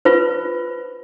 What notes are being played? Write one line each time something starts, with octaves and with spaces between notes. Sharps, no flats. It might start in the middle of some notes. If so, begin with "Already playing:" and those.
F4 B4 C5